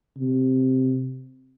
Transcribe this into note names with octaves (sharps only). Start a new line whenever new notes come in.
C3